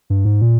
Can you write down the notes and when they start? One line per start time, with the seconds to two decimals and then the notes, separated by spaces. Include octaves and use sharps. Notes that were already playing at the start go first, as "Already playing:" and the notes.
0.10 G2
0.25 G#2
0.41 A#2